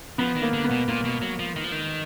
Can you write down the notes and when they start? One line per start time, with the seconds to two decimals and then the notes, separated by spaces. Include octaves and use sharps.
0.18 F3 B3
0.36 D#3
0.42 A#3
0.53 D3
0.64 B3
0.71 B2
0.88 A#2 A#3
1.05 B2
1.22 F#3
1.39 F3
1.56 D#3
1.64 F3
1.72 D#3